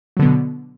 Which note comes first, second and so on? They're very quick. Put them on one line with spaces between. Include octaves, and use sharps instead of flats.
F#3 D3 B3 B2